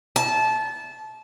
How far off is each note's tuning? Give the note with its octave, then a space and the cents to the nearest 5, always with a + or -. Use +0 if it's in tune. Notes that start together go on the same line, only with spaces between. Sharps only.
A5 -20